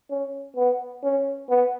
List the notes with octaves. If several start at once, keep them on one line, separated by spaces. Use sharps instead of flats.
C#4
B3
C#4
B3